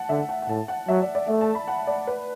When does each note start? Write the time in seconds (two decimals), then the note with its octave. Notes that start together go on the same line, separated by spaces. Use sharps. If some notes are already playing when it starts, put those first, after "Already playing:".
Already playing: F#5 A5
0.09 D3 E5
0.29 F#5
0.42 F#5
0.48 A2 A5
0.68 F#5
0.88 F#3 E5
1.02 D5
1.15 D5
1.28 A3 E5
1.41 A5
1.55 B5
1.68 F#5
1.87 D5
2.07 B4